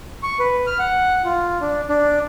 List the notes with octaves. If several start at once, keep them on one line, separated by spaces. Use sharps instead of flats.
C#6
B4
F6
F#5
F4
D4
D4